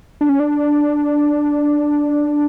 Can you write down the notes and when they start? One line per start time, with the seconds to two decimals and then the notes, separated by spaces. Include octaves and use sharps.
0.21 D4
0.29 C#4
0.40 D4